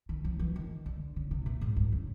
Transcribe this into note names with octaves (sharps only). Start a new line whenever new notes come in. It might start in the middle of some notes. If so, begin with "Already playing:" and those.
D#3
F3
E3
D#3
D3
C#3
C3
A#2
G#2
G2
C#3